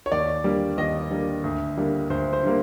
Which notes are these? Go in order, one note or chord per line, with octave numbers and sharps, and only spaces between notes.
C#5
D#2 D5
D3 G3 A#3
D#2 D#5
D3 G3 A#3
D2
D3 G3 A#3
D2 C5
C5
D3 G3 A#3